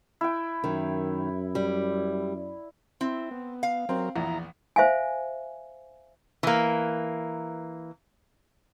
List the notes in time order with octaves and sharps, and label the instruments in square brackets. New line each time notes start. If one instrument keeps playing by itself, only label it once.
[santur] E4 G5
[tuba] F#2 [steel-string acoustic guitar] D#3
[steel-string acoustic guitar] G3
[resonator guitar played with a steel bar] C4 [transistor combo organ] E4
[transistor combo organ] B3
[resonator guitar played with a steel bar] F5
[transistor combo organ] F#3 A#4 [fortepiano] C4
[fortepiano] A#1 E2 [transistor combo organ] E4 A#5
[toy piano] C5 E5 F5 G#5
[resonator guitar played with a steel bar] E3 A#3